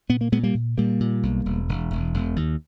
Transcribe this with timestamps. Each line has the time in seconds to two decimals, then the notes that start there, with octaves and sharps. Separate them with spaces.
0.09 A#2 B3
0.21 A#3
0.32 A#2 G#3 B3
0.43 G3 A#3
0.54 A#2
0.78 A#2 G3 A#3
1.00 A#2
1.23 B1
1.45 E1
1.68 E1
1.90 E1
2.14 E1
2.36 D#2